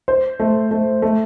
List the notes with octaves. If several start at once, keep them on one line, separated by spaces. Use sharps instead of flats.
C5
A3
A3
A3